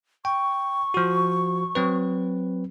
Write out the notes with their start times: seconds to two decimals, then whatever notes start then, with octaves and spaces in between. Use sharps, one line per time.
0.25 G5 C#6
0.94 F3 F#4
1.75 F#3 C4 B4